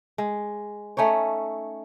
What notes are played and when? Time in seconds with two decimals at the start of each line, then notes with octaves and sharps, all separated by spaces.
0.18 G#3
0.97 A3 C#4 D#4 C#5